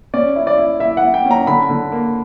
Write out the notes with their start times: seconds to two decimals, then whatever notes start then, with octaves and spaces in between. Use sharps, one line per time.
0.14 C#4 D5
0.36 E4
0.47 D5
0.58 E4
0.80 E4 E5
0.97 F#5
1.03 E4
1.14 G5
1.25 C#4
1.31 A#5
1.47 D3 B5
1.69 D3
1.92 A#3